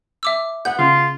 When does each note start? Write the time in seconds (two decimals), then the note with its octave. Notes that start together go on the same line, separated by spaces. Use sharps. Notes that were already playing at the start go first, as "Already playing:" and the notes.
0.23 E5 D6 E6
0.65 B3 F#5 G6
0.78 C#3 F4